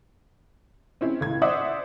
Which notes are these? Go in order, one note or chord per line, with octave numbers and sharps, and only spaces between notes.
C4 C#4 E4
C#2 A2 G#6
C5 D5 E5 F#5 D#6